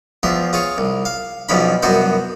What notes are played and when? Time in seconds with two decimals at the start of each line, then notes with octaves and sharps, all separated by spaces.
0.23 E2 F3 E5 C6
0.53 F4 G#4 C#5
0.78 C2
1.05 F5
1.49 B1 E2 F3 C#4 B5
1.83 C2 F#2 B3 F#4 C5